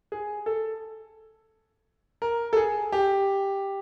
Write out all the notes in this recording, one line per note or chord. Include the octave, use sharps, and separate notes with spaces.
G#4
A4
A#4
A4
G#4
G4